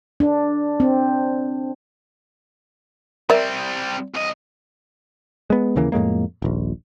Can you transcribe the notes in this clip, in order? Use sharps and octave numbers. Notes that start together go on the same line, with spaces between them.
D4
C4
G3 C4 A#4 D5 E5
C2 D#5
G#3 B3
D#2 C#3 E3 A#3
F2 A2 G#3 A#3
D#1 A#1